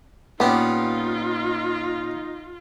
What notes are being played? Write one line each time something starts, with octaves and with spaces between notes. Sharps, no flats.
A#2 B3 C#4 D#4 F4 G4